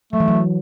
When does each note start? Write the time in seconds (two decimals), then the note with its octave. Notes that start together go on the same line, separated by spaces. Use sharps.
0.13 F#3 A3
0.20 E3
0.28 F#3